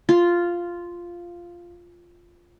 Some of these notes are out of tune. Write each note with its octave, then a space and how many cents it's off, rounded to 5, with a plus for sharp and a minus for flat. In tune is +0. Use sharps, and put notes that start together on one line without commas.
F4 -5